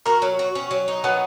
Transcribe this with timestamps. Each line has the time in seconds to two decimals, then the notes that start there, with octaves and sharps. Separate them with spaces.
0.06 F#4 A#4
0.22 F#3
0.39 F#4
0.55 C#4
0.71 F#3
0.88 D#4
1.04 F#3 B3